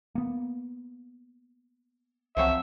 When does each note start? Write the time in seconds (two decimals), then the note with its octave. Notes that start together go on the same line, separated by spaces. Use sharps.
0.15 A#3 B3
2.37 C2 F3 F#3 C4 E5